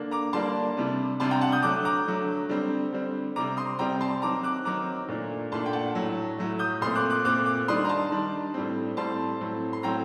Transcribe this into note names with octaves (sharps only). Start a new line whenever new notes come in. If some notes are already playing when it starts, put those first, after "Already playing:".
Already playing: D3 A#3 D4
A#5 D6
D3 G3 A#3 D4 A5 C6
C3 G3 D4
C3 G3 D4 A5 C6
G5 A#5
F#5 A5
D#6 G6
D3 F#3 A3 D6 F#6
A#5 D6
D3 F#3 A3
D3 G3 C4
D3 G3 C4
C3 G3 C4 A#5 D6
C6 D#6
C3 G3 C4 G5 A#5
A5 C6
D#3 F#3 C4 A#5 D6
D6 F#6
D#3 F#3 C4 A#5 D6
A#2 A3 D4
A#2 A3 D4 A5 C6
G5
F#5 A5
A2 F#3 A3
A2 F#3 A3
D#6 G6
A#2 A3 C4 C6 D#6
D6 F#6
D6 F#6
A#2 A3 C4 D6 F#6
D6 F#6
D#3 G3 D4 C6 D#6
A#5
A5 C6
D#3 G3 D4
A2 G3 C4
A2 G3 C4 A5 C6
A2 F#3 C4
C6
A2 F#3 C4 G5 A#5